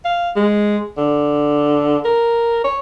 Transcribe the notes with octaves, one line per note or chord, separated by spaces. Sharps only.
F5
G#3
D3
A#4
C#5